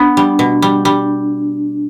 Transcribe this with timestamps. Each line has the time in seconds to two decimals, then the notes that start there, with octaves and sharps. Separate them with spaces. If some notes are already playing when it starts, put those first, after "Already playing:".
Already playing: B3 D4
0.17 G3
0.39 B2
0.62 G3
0.85 G3